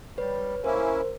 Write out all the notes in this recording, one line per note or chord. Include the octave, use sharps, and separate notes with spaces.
G3 B4 C#5
A#3 C#4 E4 A#4 C5